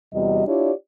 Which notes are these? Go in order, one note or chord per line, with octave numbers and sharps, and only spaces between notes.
E2 C3 G3 F#4 D#5
D4 E4 F4 G4 C#5 D5